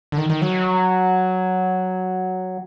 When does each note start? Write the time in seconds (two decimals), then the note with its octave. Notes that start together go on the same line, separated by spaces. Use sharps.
0.12 D3
0.18 D#3
0.30 D#3
0.42 F#3